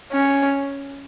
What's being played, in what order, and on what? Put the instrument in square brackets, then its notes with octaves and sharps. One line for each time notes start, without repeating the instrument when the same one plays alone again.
[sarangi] C#4